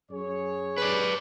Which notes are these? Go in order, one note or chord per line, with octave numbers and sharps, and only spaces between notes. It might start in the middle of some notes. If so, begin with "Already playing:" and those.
F#2 G#4 C#5
B4 D5